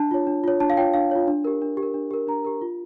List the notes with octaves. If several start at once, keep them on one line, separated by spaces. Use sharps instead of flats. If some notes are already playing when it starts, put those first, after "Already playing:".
Already playing: D4 A5
F4 C#5
D4
F4 C#5
D4 A5
F5
F4 C#5 G5
D4 F5
F4 C#5
D4
G4 A#4
D4
G4
A#4
D4
G4 A#4
D4 A#5
G4 A#4
F4